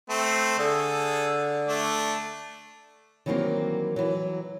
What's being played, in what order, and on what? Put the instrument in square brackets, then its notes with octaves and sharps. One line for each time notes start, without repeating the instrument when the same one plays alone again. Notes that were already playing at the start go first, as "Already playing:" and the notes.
[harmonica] A3 C4
[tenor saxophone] D3 [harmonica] G#4 A4
[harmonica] A3 D4
[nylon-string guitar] D#3 E3 F#3 G3 A#3 C4
E3 F#3